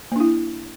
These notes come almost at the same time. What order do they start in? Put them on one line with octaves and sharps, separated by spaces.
A#3 D4 E4